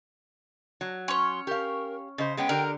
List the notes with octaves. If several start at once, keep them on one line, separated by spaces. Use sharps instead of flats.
F#3
C#4 C#5 C6
G4 A#4 F5
C#3 C5 D#5
G#3 B3 C#4 G5
D3 G4 A#4